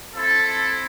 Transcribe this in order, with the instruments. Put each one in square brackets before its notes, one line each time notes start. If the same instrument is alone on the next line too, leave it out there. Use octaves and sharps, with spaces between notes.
[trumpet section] C4 E4 A4